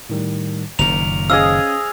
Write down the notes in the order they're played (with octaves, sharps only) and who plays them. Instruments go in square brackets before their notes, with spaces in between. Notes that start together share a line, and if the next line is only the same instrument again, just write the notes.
[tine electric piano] A2 D#3 G3
[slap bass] F#1 A#2 D#3 [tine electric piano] A#5 [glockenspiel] F7
[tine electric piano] C#4 [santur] G#4 D#5 F5 [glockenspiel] E6